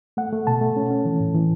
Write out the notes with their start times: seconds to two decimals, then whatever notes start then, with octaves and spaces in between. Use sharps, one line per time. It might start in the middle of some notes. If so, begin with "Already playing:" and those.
0.17 A3 F#5
0.32 A3
0.47 B2 A5
0.61 A3
0.77 C#4
0.91 C#4
1.05 E3
1.20 A2
1.35 E3